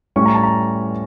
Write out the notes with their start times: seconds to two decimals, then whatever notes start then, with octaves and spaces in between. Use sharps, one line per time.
0.16 A2 G3 C#4 C#6
0.26 A#5
0.34 A5
0.43 A#5